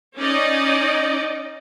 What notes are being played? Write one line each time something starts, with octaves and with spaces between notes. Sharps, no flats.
C#4 D#4 D5 D#5